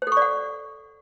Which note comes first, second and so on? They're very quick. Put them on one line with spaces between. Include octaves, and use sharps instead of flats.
C5 A4 C#6 D5 F#5